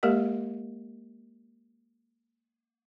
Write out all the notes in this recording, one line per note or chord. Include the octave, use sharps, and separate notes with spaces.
G#3 A#3 G4 A#4 D#5